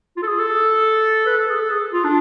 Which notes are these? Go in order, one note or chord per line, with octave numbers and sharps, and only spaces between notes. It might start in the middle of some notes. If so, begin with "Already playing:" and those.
F4
A4
G#4
A4
B4
A4
G#4
A4
G#4
F4
D4